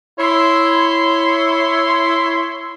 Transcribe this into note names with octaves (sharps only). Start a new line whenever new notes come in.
E4 C#5 C6